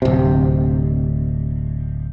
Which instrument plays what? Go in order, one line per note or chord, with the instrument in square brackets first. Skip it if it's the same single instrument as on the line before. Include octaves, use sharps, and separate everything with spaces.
[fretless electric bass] D1 C3